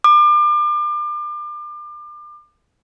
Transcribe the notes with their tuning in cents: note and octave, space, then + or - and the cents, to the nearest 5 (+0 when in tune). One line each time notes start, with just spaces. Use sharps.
D6 +35